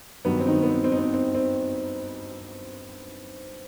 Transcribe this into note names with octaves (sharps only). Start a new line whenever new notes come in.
G2 D#3 F#3 B3
C4
D#3 D#4
B3
C4
C4
D#4
C4
C4
C4